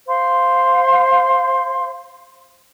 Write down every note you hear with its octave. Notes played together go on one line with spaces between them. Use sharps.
C5 F5 C6